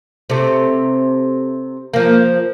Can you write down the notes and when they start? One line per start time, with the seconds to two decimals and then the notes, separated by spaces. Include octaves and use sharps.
0.30 C3 A3
1.94 F3 A#3